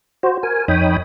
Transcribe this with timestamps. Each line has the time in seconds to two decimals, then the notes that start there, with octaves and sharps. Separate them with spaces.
0.23 F#4 C5
0.43 A#4 G#5
0.68 F2 D#4 C#5 G5 B5 D#6